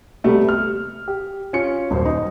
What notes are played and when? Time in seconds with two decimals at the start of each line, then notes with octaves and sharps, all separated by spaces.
0.24 C3 G3 A3 B3
0.49 F6
1.08 G4
1.53 C#4 F4 C#7
1.91 D#1 F#2 C5
2.05 D#4